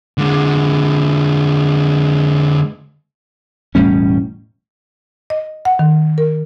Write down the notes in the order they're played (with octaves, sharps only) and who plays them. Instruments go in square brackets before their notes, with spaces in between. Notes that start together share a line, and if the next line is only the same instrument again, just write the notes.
[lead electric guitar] D3 G#3
[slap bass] E1 A2 G3 C#4
[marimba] D#5
F#5
D#3
A#4